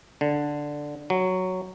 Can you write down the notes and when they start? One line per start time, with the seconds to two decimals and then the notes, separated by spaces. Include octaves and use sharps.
0.21 D3
1.10 F#3